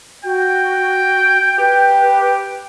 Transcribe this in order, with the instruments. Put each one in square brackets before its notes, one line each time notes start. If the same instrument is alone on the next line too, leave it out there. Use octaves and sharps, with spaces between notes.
[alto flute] F#4 [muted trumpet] G5
[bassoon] G4 [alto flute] B4